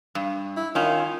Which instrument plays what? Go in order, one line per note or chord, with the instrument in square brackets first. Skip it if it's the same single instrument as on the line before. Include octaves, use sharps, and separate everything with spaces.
[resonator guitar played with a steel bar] G2
[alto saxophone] E4
[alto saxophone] D#3 [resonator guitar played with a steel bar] C#4 F4